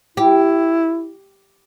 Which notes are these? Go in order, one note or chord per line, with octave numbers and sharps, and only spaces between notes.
E4 G4